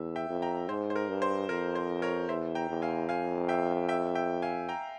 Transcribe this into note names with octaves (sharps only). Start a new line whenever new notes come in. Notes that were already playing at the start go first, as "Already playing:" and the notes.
Already playing: E2 E5
E5 G5
F2
G5 A#5
G#2 C5
C5
A#4
G2
C5
F2 A#4
C5
A#4 C#5
E2 C5 E5
G5 A#5
E2
F5 G#5
F2 F5 G#5
E5 G5
E5 G5
E5 G5
F5 G#5
G5 A#5